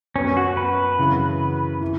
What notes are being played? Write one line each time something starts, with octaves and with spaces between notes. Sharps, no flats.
F#2 F#3 B3 C#4
F#4
B4
F#2 C#3 E3
E3